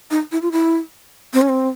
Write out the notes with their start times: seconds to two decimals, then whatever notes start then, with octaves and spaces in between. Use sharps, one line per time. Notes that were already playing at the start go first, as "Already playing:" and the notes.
0.11 D#4
0.32 E4
0.42 F4
0.52 E4
1.33 C4
1.42 C#4
1.49 C4